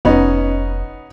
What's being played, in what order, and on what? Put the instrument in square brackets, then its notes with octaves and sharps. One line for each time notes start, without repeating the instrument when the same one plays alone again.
[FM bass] F1 [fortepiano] B3 C#4 D#4